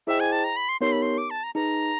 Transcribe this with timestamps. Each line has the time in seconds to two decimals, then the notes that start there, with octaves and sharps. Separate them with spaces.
0.07 E4 G#4 C5 D#5 E5 G5
0.20 G#5
0.32 A5
0.44 A#5
0.56 B5
0.69 C6
0.81 B3 D#4 G4 A#4 C#5 C6
0.92 B5
1.02 C6
1.18 D6
1.30 A5
1.43 A#5
1.55 D#4 G#4 B4 A#5